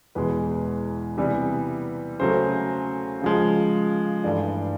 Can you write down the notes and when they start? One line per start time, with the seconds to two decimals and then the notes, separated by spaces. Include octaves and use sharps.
0.15 E2 B2 G#3 B4
1.18 C3 E3 G3 B3
2.20 C#3 F#3 A3 C5
3.22 C#3 F3 G#3
4.24 G2 E3 A3 D5